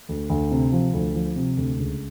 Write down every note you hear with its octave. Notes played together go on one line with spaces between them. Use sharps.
D2
D2
C3
F3
D2
F3
C3
D2
C#2